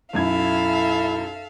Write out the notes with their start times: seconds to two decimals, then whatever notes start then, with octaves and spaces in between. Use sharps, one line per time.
0.13 B1 F#2 E4 A4 E5 F5 G#6